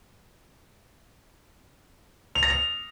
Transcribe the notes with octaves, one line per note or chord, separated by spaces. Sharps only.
F7
A#6
F7